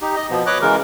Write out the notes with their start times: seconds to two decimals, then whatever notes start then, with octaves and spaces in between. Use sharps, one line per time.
0.01 D#4 G4
0.16 D#5
0.30 B2 F3 B3
0.47 B4 C#5 D#5 D6 F#6
0.62 C#3 E3 G#3 A#4